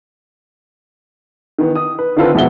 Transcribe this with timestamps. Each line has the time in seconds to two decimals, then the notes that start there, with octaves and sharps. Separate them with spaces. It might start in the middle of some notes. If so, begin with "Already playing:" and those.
1.58 D#3 E3 B3
1.75 D#6
1.99 B4
2.17 D3 D#3 C4 F4 A4 B4
2.35 E1 B2 F3 E5 F#5 G7